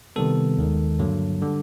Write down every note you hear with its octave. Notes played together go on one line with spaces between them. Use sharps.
C3 D#3 G3 B3 A4
D#2 D#3 G#3
G2 D3 F#3 A#3
D3 G3